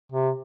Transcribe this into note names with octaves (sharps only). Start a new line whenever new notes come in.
C3